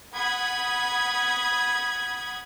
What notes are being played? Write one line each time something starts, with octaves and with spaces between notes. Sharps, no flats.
F#5 B5 D#6 G#6